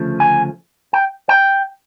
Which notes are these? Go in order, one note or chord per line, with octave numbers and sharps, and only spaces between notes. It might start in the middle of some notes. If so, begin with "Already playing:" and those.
Already playing: D2 C#3 F3 A3
G#5
G5
G5